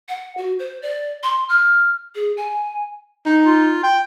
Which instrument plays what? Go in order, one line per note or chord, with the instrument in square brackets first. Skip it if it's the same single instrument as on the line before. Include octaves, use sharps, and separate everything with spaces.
[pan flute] F#5
F#4
C5
D5
C6
F6
G#4
G#5
[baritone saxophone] D#4
[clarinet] F4
G5